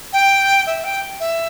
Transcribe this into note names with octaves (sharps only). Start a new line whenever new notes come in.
G5
E5
G5
E5